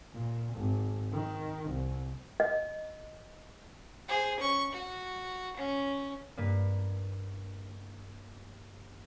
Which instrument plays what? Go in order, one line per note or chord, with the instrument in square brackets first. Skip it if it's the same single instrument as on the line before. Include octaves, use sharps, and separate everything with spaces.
[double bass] A#2
G#1
D#3
C2
[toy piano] D#5
[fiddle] G#4 C5
C#4 C#6
F#4
C#4
[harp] G2 A#3 B4